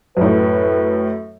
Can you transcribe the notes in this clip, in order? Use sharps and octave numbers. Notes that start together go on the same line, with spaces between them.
F#2 A2 B4